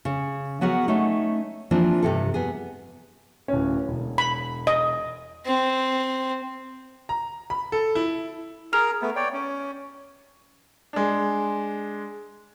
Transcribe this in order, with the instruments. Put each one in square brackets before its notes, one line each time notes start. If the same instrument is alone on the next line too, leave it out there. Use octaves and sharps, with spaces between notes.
[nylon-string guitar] C#3
F#3 B3 F#4 G#4 A#4
A3 C#4 D#4
E3 F3 A#3 C4 D4
G2 C3 A4
G3 B3 G#4
[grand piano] D1 C#4
E1
[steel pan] B5
D#5
[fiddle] C4
[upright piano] A#5
B5
A4
E4
[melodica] G#4 A#4 A#5 [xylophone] F6 F7
[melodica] A3 B3
C#5 D5 G5
C#4
[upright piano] G#3 D4